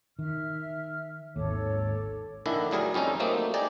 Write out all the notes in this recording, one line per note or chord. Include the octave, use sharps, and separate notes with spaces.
D#3 E5 F6
G#1 D#2 A4 C#5 D6
A#1 D3 D#3 D4 E4
D2 F#3 G3 G#4 A#4 G#5
F2 G3 C#4 D#4 A4
F#3 G3 A3 A#3 C4 D#4
D#4 G4 G#4 D5 D#5